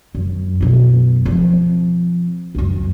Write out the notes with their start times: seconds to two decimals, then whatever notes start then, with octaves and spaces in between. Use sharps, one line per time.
0.15 F#2
0.61 F#2 B2
1.25 F3 C4
2.55 C#2 F#2